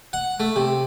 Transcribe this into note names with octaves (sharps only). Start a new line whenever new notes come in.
F#5
A3
C3